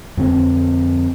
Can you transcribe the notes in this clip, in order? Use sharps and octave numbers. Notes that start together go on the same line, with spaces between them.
F2 D3 B3 C4